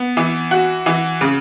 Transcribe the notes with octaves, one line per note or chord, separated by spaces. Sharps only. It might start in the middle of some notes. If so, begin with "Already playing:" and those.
Already playing: B3
E3
F#4
E3
C#3